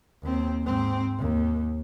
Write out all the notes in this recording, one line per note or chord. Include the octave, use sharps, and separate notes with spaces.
D#2 C4
G#2 C4
D#2